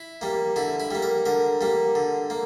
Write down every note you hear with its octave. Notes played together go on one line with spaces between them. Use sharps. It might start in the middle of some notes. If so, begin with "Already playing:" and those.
Already playing: E4
G3 A#3
D3 E4
E4
G3 A#3
A#4
D3 A#4
G3 A#3
D3
A#3